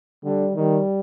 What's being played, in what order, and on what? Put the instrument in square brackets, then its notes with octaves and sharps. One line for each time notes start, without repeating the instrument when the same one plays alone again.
[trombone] D3 [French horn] G3
[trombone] D#3 [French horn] G3